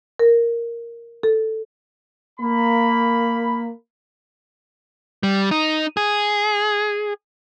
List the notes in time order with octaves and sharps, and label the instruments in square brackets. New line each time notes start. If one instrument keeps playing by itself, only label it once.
[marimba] A#4
A4
[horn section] A#3 B5
[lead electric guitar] G3
D#4
G#4